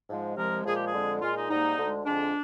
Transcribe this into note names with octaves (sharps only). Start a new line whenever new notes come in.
G#2 F3 G#3
C2 C3 F3 G#3 A#4
A#2 F3 G#3 G#4
G4
G#4
F2 D3 G#3
A#2 G#3 F4
D#4
G#2 G3 A#3 D#4
D2 D3 G#3
F2 D3 G#3 D4